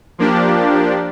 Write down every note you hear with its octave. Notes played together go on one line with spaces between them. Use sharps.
F3 A#3 D4 G4